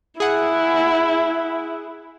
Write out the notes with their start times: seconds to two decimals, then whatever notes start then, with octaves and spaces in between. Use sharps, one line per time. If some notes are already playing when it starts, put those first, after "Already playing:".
0.20 E4 G#4 F#5